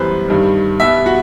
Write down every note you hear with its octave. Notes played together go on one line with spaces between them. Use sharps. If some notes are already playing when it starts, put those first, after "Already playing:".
Already playing: F#2 E3 G3 B3 B4 C5
G2 D#3 G3
B2 G3 B3 E5
F#4